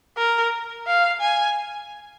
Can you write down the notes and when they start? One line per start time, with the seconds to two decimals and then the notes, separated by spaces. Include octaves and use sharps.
0.18 A#4
0.87 F5
1.20 G#5